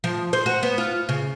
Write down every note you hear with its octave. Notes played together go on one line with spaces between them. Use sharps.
F3
C5
F#4
B3
F4
C#3